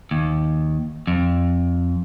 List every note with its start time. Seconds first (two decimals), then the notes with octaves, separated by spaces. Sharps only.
0.11 D#2
1.07 F2